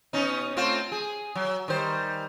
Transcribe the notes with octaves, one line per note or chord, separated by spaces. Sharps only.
B2 C#4 D#4
A3 C4 F4
G#4
F#3
D#3 G3 C5